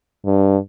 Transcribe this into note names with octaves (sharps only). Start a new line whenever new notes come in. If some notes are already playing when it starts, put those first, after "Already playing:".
G2